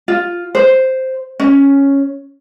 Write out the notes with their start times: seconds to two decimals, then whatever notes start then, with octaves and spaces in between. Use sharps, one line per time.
0.08 F4
0.55 C5
1.40 C#4